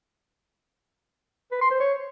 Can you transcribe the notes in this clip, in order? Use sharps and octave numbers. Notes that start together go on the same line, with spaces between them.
B4
C6
C5
C#5